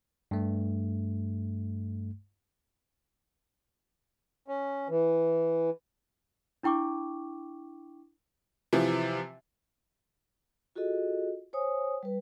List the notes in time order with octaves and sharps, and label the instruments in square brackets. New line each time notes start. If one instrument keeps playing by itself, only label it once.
[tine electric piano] G2 A3
[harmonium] C#4
E3
[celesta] D4 E4 G5 C#6 D6
[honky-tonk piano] C3 E3 F3
[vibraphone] F4 F#4 G#4 A4 D#5
C5 C#5 G#5 D#6
G3 B4